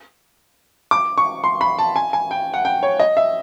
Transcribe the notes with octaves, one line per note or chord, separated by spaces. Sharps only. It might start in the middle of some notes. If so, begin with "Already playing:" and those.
D6
C#6
C6
B5
A5
G#5
G#5
G5
F#5
G5
C#5
D#5
E5